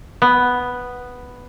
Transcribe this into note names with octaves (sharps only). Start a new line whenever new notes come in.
B3